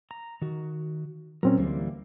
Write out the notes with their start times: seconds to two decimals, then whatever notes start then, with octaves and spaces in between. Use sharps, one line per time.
0.11 A#5
0.42 D#3 F#4
1.43 A#2 F#3 C4 C#4 A#4
1.59 D2 E3 G3 A#3